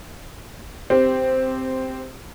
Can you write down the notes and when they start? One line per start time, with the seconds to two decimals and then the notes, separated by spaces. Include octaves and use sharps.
0.90 C4 G4